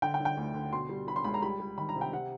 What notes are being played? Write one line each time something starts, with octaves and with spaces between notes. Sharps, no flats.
D3 G5
G5
D3
G5
D2
D3
B2 C6
G3
G3 B5
C6
C#2 B5
A#5
G3 B5
G3
D#3 B5
A#5
C3
G5
C3 F#5